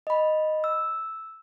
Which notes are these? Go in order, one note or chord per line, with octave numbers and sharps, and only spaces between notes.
D#5 B5
E6